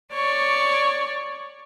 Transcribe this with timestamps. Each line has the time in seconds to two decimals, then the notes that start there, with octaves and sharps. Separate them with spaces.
0.13 C#5 D5 C#6